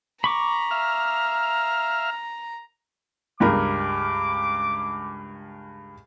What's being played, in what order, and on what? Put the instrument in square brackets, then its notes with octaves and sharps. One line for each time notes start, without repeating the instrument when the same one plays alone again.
[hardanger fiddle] A#5 [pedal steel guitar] B5 C#6 D6
[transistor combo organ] E5 F5 F6
[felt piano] C#2 G2 A#4 [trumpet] D6